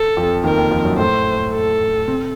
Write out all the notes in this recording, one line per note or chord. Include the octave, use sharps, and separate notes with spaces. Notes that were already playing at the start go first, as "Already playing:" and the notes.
Already playing: A4
F2 F3
D#2 D#3 A#4
D#2 D#3
F2 F3
F#2 F#3
A2 A3 C5
A4
C3 C4